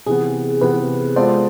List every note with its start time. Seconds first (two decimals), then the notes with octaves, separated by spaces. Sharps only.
0.06 C3 E3 B3 G#4
0.61 C3 E3 B3 B4
1.16 G#3 B3 F4 A4 C5 D5